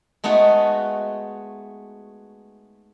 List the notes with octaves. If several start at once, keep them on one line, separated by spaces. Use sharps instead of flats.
G#3 A3 B3 D#4 F#4